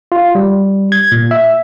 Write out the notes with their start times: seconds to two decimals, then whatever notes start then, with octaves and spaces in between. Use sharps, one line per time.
0.12 F4
0.35 G3
0.92 G#6
1.12 A#2
1.31 E5